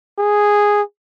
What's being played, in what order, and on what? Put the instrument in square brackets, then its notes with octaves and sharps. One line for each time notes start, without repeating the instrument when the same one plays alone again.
[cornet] G#4